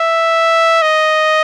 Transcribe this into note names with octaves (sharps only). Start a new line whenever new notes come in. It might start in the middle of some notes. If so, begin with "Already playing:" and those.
Already playing: E5
D#5